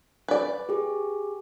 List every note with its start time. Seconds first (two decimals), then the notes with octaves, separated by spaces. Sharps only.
0.28 B4 D5
0.69 G4 G#4